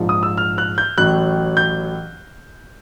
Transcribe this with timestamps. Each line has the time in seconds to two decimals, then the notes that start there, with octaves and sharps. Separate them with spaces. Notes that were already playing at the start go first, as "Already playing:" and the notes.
Already playing: A#1 G#2 F3
0.09 D#6
0.23 E6
0.38 F6
0.58 F#6
0.78 G6
0.98 A1 A2 F#3 F#6
1.57 G6